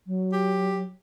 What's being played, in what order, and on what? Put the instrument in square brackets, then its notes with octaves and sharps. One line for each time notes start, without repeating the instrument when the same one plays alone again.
[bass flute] F#3
[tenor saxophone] G4